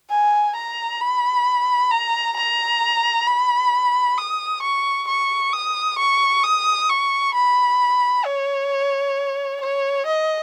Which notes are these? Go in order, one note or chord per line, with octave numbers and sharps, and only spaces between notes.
G#5
A#5
B5
A#5
A#5
B5
D#6
C#6
C#6
D#6
C#6
D#6
C#6
B5
C#5
C#5
D#5